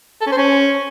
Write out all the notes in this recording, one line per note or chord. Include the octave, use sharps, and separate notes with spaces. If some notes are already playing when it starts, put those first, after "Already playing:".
A4
C#4
C5
C#4